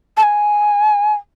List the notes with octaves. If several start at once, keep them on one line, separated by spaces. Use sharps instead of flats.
A5
G#5